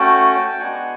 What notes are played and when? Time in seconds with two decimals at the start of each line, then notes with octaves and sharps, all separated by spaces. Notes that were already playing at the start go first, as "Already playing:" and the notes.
Already playing: A3 C#4 F#4 G5 A5
0.59 G#3 B3 D4 F#4 F#5 G#5